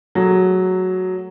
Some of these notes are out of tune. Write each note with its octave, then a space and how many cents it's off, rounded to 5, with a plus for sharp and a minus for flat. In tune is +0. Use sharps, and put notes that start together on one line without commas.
F#3 +0 A3 +0 G#4 +0